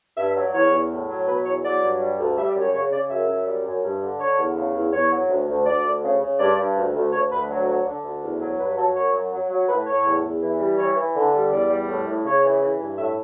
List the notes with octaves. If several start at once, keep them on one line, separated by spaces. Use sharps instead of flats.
G2 E5
E5
F#3
D5
E2 C#5
E2
A2
F#3
B2 B4
E2 C#5
F#3 D5
G2
G3
D2
G3 E5
D5
F#2
C#5
C#3 C#5
C#3 D5
F#2 E5
F#2
G3
F#2
G2
D3
D3 C#5
E2
C#3
E2
E2 C#5
F#3
D2
D2
D2 D5
D2
C#3
C#3
G2 D5
G2
D2
D2
D2 C#5
D2 B4
F#3
F#3
D3
D2
E2
F#3
G2 B4
F#3 A4
F#2 C#5
F#3
F#3
F#3
A2 B4
A2 C#5
E2
E2
E3
G3
E3 C#5
E3
D3
G3
E2 D5
G3
A2
A2
C#3 C#5
E3
E3
G2
A2 E5